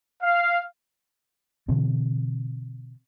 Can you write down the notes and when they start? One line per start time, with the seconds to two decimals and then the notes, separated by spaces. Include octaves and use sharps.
0.23 F5
1.68 B2 D3 E3 C4